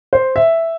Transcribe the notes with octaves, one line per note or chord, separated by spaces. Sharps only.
C5
E5